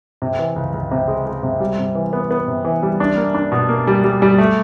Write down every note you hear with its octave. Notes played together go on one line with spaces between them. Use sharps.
C3
E3
C#2
C#2
C3
G#3
G#3
C3
G3
C3
E3
B3
B3
C3
E3
G3
D4
A#3
D4
B2
A#3
G3
G3
G3
A3